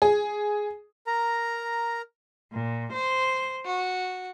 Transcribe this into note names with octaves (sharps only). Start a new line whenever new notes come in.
G#4
A#4 A#5
A#2
C5
F#4